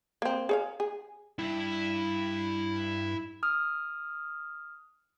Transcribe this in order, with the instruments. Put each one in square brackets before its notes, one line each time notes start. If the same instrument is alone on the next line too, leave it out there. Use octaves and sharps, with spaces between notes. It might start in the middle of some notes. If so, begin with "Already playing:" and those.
[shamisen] A#3 C4
G#4 C#5 F5
G#4
[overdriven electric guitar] G2 [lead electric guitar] E4 E5
[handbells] D#6 F6